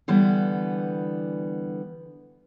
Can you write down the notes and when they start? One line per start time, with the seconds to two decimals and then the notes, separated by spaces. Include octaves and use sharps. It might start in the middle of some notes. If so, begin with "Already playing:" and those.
0.08 D3 E3 G3 B3